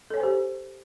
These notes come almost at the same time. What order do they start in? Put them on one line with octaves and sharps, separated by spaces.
A4 C#5 G#5 C5 G4